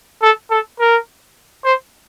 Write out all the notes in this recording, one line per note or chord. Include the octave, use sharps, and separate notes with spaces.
A4
A4
A#4
C5